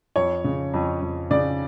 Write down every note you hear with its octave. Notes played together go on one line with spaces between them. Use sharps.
F2 C#5
C#3
F2
F2
C#3 D5